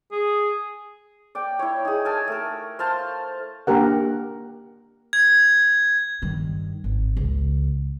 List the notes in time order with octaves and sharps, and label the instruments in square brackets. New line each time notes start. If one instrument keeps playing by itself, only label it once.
[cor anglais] G#4
[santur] D5 G5
E4 C#5
D#4 G#4
A#4 G#5 A5 E6
A3 A#4
C5 F5 A5 C6
[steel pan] A#3 D4 G4 A#4 F#5
[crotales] G#6
[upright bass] G2 D#3
G#1
C#2